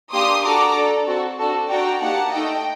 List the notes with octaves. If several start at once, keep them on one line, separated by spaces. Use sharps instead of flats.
A#3 D4 G4 C6 D#6
D4 F#4 A4 A#5 D6
D4 A4
C4 F#4 A4
D4 F#4 A4
D4 F#4 A4 G5 A#5
A#3 D#4 G4 F#5 A5
A3 D#4 A4 D#5 G5